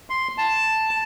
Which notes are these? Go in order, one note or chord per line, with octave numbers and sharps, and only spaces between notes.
C6
A5